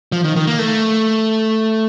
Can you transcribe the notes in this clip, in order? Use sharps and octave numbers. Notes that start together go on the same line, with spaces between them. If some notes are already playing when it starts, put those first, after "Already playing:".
F3
D#3
D#3
A#3
A3